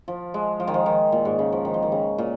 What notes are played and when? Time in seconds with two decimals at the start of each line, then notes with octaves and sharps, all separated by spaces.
0.08 F3
0.34 G#3
0.60 F3
0.67 D#3
0.74 F3
0.86 D#3
1.12 A#2
1.25 G#2
1.39 C#3
1.52 F3
1.65 D#3
1.74 F3
1.82 D#3
1.92 C#3
2.18 A#2